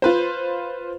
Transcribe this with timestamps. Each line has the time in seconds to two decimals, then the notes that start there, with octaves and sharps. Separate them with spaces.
0.02 F4 B4 C5